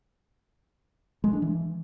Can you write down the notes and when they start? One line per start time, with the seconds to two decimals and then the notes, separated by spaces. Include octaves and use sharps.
1.24 G#3
1.33 D4
1.42 E3